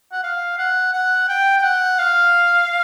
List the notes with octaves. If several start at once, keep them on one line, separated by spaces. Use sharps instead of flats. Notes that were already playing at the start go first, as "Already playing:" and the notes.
F#5
F5
F#5
F#5
G5
G5
F#5
F5